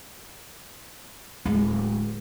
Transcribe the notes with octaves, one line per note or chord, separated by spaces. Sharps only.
D1 G#3